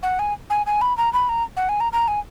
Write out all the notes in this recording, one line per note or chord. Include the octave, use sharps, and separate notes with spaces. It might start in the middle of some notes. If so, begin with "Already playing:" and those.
F#5
G#5
G#5
G#5
B5
A#5
B5
A#5
F#5
G#5
A#5
A#5
G#5